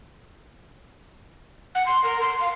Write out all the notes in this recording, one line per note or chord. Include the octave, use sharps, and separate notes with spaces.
F#5
C6
A#4
C6
F5